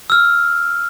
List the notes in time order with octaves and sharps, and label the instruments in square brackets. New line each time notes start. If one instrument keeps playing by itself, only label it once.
[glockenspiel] E6 F6